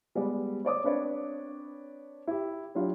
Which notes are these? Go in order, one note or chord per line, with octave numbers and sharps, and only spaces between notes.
G3 G#3 B3 G4 D5
C#5 D5 D6 D#6
C4 D4 B4 C#5 D5
E4 G4
F#3 D4 E4 F4 G4